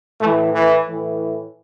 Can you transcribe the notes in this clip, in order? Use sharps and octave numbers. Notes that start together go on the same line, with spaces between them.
A2 E3 A3
E3
A2 E3